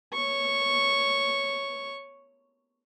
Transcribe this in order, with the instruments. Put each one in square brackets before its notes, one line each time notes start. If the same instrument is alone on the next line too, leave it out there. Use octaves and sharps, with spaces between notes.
[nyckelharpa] C#5 C#6